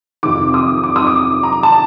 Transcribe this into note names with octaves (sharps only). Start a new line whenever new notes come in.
F2 C3 D#3 D6
D#6
D6
D#6
D6
A#5
A5